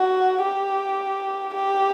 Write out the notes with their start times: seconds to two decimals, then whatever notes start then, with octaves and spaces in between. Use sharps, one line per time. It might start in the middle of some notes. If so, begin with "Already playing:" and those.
Already playing: F#4
0.43 G4
1.54 G4